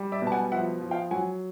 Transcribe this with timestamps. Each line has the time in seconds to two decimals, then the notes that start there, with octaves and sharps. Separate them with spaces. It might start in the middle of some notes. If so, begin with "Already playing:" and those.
Already playing: G3
0.12 D5 E5
0.22 B2 A5
0.32 F#5 G#5
0.52 F3 E5 F#5
0.81 F3
0.91 F5 G5
1.11 F#3 F#5 G#5